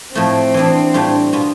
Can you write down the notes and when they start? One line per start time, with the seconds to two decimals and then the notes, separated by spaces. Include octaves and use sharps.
0.15 A2 F3 A3 C4
0.54 E3 B3 D4
0.94 A2 G3 D4 F4
1.33 B2 B3 F4